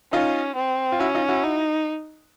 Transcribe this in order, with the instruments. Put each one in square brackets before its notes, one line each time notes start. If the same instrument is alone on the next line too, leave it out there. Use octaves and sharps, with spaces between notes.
[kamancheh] C#4 [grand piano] D#4 F4
[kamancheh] C4
[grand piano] F4
[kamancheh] C#4 [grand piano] E4 F#4
[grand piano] D#4 F4
E4 F#4
[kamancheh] D#4